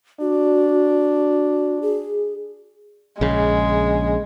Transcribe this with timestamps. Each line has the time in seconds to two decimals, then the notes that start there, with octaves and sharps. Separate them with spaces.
0.21 D4 F#4
1.82 G#4
3.21 A#1 C#3 G#3